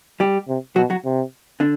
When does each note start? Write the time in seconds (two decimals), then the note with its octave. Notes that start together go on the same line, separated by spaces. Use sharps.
0.20 G3 G4
0.48 C3
0.76 B2 F#3 F#4
0.90 F#3 F#4
1.05 C3
1.60 D3 D4